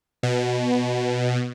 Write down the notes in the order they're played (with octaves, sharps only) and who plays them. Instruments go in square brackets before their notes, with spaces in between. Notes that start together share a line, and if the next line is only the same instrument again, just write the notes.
[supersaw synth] B2